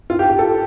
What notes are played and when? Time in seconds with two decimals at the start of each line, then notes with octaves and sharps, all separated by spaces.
0.10 F4
0.19 G4
0.30 G4
0.39 A4